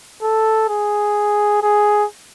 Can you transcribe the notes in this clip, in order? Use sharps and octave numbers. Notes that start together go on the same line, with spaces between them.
A4
G#4
G#4